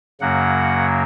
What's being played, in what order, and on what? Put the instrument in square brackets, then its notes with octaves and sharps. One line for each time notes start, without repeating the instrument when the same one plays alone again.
[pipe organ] F#2 C#3 F#3 A#3 F#5